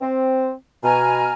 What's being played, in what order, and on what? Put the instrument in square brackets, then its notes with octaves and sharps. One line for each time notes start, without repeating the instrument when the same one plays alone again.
[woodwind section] C4
[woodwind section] B2 [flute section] G#5 A#5 F6